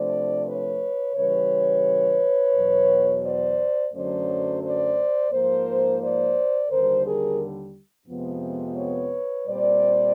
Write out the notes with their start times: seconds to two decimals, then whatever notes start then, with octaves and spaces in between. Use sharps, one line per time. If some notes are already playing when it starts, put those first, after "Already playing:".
Already playing: C3 F3 A3 D4 C5 D5
0.47 B4 C#5
1.16 C#3 E3 G3 B4 C#5
2.54 E2 B2 F#3
3.24 C5 D5
3.92 F#2 D3 F#3 A3 C#4 C5 D5
4.62 C5 D5
5.31 G#2 F3 A#3 A#4 C5
6.00 C5 D5
6.70 D#2 D3 G3 A#4 C5
7.04 G#4 A#4
8.08 F2 C3 F3 G#3 B3
8.77 B4 C#5
9.46 A#2 G3 C4 C5 D5